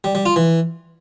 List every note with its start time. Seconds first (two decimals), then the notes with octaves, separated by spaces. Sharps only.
0.04 G3
0.15 G3
0.26 F4
0.36 E3